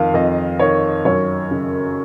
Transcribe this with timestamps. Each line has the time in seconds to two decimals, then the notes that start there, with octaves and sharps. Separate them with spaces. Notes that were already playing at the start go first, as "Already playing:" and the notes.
Already playing: F2 D#3 F5
0.14 F2 D#5
0.59 D#3 C#5
1.05 F#2 C#5
1.51 C#3